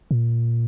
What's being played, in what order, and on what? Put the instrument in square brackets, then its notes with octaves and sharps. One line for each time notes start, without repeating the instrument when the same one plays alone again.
[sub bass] A#2